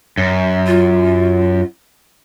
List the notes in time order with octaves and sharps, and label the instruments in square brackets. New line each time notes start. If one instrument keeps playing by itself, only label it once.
[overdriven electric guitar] F#2
[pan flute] F4